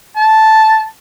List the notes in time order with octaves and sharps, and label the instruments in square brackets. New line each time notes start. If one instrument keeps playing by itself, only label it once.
[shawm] A5